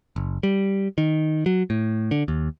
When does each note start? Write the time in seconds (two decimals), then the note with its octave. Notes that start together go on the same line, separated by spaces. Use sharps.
0.16 F#1
0.43 G3
0.98 D#3
1.46 F#3
1.70 A2
2.11 D3
2.28 D#2